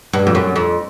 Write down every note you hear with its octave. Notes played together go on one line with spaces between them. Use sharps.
G2
F2
F#2
F2